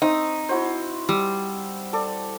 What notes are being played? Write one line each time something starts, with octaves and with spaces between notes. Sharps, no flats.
C4 D#4 C#6
E4 F#4 C5
G3 E6
A4 D5